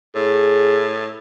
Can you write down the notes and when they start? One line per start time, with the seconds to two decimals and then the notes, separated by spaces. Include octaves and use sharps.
0.15 A2 G#4